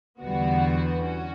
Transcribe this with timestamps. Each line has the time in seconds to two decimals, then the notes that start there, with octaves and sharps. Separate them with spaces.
0.21 E2 D3 G3 B3 F#4
1.04 C#4 F#4